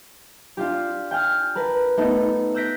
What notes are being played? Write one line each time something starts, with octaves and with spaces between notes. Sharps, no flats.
D4 F4 G4
G5 G#5 F6 G#6
A#4 B4 A5
A3 B3 D#4 A4
E6 F#6 G6 A#6 B6 D7